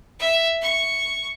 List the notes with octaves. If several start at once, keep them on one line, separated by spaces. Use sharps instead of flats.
E5
C#6